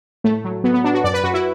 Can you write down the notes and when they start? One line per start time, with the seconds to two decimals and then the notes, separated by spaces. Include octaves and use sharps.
0.24 A2 A3
0.44 F#3
0.64 F#3 B3
0.74 B3
0.84 F#3 D4
0.94 F#4
1.04 F#2 D5
1.14 B4
1.23 F#2 F#4
1.34 E4